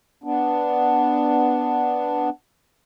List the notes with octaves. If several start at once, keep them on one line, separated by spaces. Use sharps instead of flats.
B3 D4